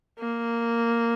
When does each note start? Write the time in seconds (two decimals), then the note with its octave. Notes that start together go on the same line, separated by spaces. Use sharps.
0.19 A#3